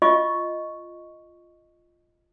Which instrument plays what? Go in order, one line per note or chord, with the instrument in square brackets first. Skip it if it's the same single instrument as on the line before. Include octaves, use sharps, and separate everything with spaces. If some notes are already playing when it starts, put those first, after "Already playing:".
[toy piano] F4 D#5 C#6